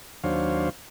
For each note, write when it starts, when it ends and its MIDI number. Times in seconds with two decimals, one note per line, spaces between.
0.24 0.69 39
0.24 0.69 54
0.24 0.69 62
0.24 0.69 72
0.24 0.69 73
0.24 0.69 77